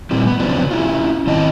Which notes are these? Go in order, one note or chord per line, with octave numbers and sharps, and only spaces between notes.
A#2 E3 G3 C4
B3
C#3 F3 F#3 B3 C4 D4
C#4 E4 F4
D#3 C4 E4 D#5 A5